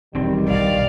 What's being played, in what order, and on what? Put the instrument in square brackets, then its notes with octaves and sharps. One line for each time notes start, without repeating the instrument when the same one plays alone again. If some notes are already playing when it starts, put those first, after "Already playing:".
[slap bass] E1 C4 [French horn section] D#3 G3
[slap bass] B1 G2 [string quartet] D5 F5